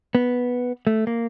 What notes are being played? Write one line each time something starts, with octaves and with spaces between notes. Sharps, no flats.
B3
A3
A#3